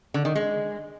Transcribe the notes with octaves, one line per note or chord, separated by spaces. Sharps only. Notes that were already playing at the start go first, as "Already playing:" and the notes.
D3
D#3
G#3